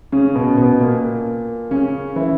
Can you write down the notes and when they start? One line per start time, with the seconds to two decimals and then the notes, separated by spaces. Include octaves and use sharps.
0.12 C#3 C#4
0.35 B2 B3
0.58 B2 B3
0.80 A#2 A#3
1.71 C#3 C#4
2.16 E3 E4